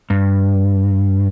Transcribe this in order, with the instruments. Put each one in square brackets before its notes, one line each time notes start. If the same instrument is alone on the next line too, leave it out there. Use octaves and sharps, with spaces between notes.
[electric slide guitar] G2